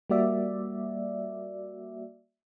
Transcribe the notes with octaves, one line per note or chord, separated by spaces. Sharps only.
G3 A#3 F#4 D5 E5